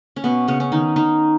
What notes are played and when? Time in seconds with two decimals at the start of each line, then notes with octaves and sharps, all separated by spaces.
0.16 C#4
0.24 B2 B3
0.48 C#3 C#4
0.60 C#4
0.72 D#3 D#4
0.96 D#3 D#4